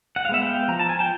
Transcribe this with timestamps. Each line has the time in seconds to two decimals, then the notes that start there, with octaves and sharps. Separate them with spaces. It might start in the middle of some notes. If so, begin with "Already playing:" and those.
0.16 F#5
0.25 F5
0.29 G#3 B3 E5 F#5
0.42 F5 G5
0.68 F3 A#5
0.79 A5
0.89 G#5
0.99 G5 A5